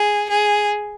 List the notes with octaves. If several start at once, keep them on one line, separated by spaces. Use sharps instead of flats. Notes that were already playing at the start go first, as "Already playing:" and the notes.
Already playing: G#4
G#4